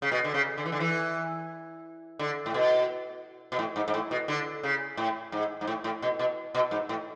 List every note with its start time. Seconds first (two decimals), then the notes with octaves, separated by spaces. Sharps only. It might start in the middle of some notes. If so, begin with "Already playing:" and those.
0.02 C#3
0.12 B2
0.24 D3
0.34 C#3
0.58 D3
0.66 E3
0.72 D3
0.80 E3
2.19 D3
2.46 A2
2.54 B2
3.52 B2
3.59 A2
3.76 G#2
3.88 G#2
3.94 A2
4.11 B2
4.28 D3
4.63 C#3
4.97 A2
5.32 G#2
5.61 G#2
5.67 A2
5.84 A2
6.02 B2
6.19 B2
6.55 B2
6.71 G#2
6.89 A2